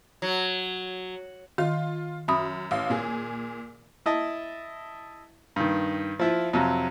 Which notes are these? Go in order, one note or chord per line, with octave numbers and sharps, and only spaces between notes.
F#3
D#3 F4
F#2 E5 B5 D#6
A1 F5
A#2 G#4
E4 D#5 A5
G2 D#3
F3 E4 F4
F2 C3 F#3